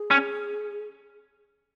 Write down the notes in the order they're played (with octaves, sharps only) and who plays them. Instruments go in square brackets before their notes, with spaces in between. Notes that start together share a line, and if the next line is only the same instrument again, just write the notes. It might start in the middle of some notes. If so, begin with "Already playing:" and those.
Already playing: [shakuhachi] G#4
[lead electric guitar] C#4